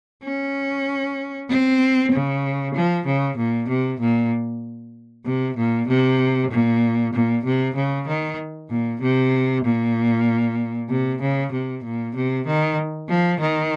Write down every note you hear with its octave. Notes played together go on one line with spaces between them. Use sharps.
C#4
C4
C#3
F3
C#3
A#2
C3
A#2
C3
A#2
C3
A#2
A#2
C3
C#3
D#3
A#2
C3
A#2
C3
C#3
C3
A#2
C3
D#3
F3
D#3